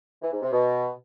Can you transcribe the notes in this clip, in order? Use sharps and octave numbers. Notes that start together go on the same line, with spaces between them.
E3
G#2
C3
B2